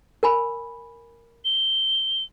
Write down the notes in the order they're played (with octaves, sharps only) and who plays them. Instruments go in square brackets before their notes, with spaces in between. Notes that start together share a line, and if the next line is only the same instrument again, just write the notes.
[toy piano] A#4 G#5 B5
[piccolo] G7